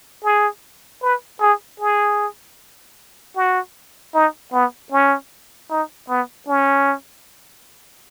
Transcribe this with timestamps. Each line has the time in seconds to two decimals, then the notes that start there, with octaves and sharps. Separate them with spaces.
0.24 G#4
1.02 B4
1.41 G#4
1.80 G#4
3.36 F#4
4.14 D#4
4.53 B3
4.92 C#4
5.70 D#4
6.09 B3
6.48 C#4